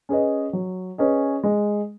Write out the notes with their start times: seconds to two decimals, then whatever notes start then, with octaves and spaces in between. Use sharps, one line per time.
0.09 C#4 G#4 B4 D#5
0.53 F#3
0.98 C#4 G#4 B4 D#5
1.43 G#3